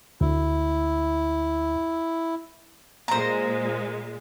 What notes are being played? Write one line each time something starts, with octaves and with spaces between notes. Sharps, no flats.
D2 E4
A#2 G#3 C5 A#5